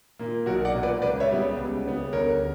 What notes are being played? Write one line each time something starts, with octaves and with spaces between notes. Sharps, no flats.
A#2 A#3
B1 F#4 A#4
D5 F#5
A#2 A#3
B4 D5
C#2 B4 D5
C#5 E5
C#3 G3 B3
C#2
C#3 G3 B3
D2 A#4 C#5